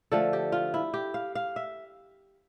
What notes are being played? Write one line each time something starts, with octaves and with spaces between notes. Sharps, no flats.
D3 F3 A3 A4
G4
F4
E4
G4
F5
F5
E5